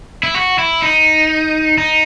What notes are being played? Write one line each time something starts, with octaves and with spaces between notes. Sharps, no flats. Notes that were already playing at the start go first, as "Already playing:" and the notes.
E4
F#4
E4
D#4
D#4